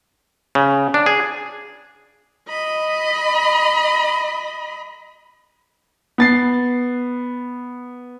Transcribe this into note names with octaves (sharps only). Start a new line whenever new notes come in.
C#3
D4
G#4
D#5 B5
B3 A6 C7